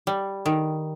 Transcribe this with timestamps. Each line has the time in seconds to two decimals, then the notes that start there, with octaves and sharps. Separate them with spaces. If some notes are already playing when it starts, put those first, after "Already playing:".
0.07 G3
0.46 D#3